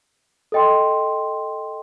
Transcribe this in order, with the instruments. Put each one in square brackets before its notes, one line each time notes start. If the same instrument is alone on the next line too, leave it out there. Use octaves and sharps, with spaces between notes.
[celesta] A4 D#5 G5 C6